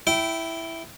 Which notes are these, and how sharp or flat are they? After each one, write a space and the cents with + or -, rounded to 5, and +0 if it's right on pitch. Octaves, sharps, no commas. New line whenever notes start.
E4 +0 G5 -20